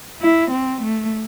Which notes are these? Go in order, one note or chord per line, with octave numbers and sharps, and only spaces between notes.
E4
C4
A3